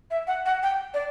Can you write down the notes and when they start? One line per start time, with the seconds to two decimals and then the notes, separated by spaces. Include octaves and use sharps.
0.11 E5
0.27 F#5
0.46 F#5
0.63 G5
0.94 D5